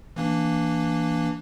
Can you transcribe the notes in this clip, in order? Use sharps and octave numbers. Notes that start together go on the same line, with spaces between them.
E3 A#3 D4